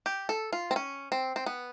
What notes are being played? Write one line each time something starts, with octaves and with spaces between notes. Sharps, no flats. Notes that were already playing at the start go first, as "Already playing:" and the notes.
G4
A4
F4
C4
C#4
C4
C4
B3